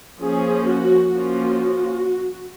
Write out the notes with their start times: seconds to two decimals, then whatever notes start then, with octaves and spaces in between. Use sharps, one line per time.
0.20 F3 A#3 C#4 G#4
0.66 F#4
1.10 F3 A#3 C#4 F4 F#4